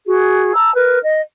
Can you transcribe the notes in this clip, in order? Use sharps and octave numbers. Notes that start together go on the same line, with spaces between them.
F#4 G#4
A5 A#5 E6
A#4 B4
D#5